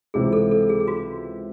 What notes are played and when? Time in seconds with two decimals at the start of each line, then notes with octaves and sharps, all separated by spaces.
0.14 C#2 C3 E3 G#4
0.33 A4
0.51 A4
0.69 G#4
0.80 G#4
0.88 F#4